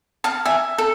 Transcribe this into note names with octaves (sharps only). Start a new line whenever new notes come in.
F5 A5
E5 G#5
A4